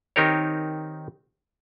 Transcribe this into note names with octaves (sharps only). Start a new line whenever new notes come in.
D#3 C4 D#4 G4 A#4 C#5